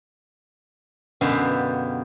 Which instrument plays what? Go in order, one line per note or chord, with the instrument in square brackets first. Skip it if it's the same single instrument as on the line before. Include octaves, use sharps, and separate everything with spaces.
[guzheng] F#2 B2 D3 G3 E5 F5